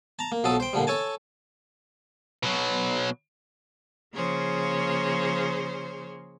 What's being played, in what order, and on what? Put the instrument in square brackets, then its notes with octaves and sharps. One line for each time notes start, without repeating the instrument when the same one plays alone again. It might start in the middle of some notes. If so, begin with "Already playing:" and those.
[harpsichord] A5 A#5
A#3
B1 F3 F#3 A4 A5 D#6
C5 G5
A#2 D3 F3 G3
A4 C#5 G#5 A5
[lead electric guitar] B2 F#3
[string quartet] C#3 F3 A#3 G#4 C5 C#5